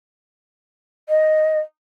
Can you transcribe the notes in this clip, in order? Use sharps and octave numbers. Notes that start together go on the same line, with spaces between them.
D#5